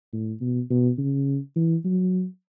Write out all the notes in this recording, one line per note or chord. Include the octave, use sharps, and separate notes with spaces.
A2
B2
B2
C#3
E3
F#3